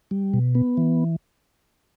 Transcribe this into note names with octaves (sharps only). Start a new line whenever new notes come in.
G3
B2
B3
E3